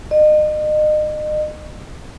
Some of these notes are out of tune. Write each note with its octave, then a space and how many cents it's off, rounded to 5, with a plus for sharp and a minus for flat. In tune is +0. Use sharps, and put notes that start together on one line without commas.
D#5 -35